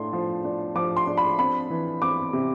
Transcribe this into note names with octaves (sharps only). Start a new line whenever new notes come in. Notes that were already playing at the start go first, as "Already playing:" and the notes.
Already playing: A2 D4 C6
F3
D4
F3 D6
C6
D4
B5
C4 B5
E3
C4 D6
C3